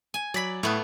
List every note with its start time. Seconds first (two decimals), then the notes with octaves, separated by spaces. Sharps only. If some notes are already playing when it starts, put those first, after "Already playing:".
0.14 G#5
0.34 F#3 D5 B5 B6
0.63 A2 A3 B3 F#6